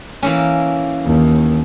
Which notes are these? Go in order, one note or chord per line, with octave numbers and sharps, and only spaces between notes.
E3 A#3 C#4
D#2